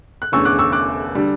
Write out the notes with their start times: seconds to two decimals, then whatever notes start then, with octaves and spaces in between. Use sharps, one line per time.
0.22 F#6
0.32 E2 D3 A3 C#4 C#6 E6
0.45 D6 F#6
0.59 C#6 E6
0.72 D6 F#6
1.15 D3 G3 D4